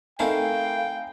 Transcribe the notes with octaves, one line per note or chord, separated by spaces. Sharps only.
A3 C4 D#4 E4 A#4 F5 G5 G#5